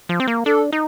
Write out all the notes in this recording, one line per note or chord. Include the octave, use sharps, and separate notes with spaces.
F3
C4
A#3
D4 A4
D#4